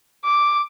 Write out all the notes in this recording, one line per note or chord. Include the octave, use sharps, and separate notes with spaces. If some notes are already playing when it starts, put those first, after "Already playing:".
D6